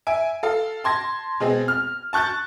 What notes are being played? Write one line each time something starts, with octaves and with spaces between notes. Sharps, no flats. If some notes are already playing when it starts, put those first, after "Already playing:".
E5 G#5 D7
A4 F5
A5 C6 G#6 A#6
B2 G#3 C4 G#4
F6
A5 C#6 F#6 G6 A6